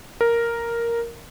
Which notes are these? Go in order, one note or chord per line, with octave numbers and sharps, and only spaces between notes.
A#4